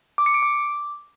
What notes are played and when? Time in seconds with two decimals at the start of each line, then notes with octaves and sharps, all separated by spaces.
0.18 D6
0.26 C#7
0.34 D7
0.42 D6